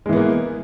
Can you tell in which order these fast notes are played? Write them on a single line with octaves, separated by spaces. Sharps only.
G#3 E3 B3 A#3